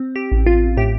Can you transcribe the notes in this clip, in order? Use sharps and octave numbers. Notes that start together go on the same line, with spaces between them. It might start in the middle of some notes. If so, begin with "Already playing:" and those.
Already playing: C4
G4
A1
F4
A2 G4